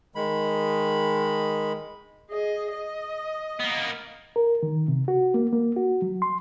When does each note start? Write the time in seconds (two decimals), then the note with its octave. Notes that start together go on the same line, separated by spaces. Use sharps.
0.15 D#3 G#3 B5
2.30 G#4 D#5
2.73 D#5
3.60 A#3 B3
4.36 A#4
4.63 D#3
4.88 C3
5.08 F#4
5.34 A#3
5.53 A#3
5.76 F#4
6.02 F#3
6.22 C6